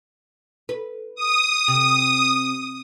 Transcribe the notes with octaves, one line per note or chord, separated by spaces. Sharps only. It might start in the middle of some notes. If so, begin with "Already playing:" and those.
B4
D#6
C3